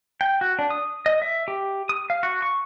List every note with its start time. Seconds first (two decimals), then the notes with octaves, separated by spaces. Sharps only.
0.21 G5
0.41 F#4
0.59 D4
0.71 D#6
1.06 D#5
1.22 E5
1.48 G4
1.89 D#6
2.10 F5
2.23 F#4
2.42 C#6